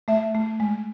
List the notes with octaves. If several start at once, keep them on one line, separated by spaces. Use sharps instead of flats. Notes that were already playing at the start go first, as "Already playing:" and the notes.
A3 E5
A3
G#3